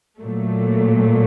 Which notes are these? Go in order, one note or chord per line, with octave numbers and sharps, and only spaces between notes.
A#2 F#3 A3